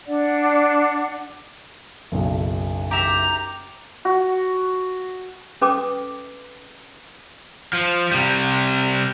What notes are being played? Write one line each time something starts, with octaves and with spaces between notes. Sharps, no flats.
D4 D5 F#5
F#1 B1
G4 E5 A#5
F#4
C#4 A4 B4 G5 D6
F3
C3 G3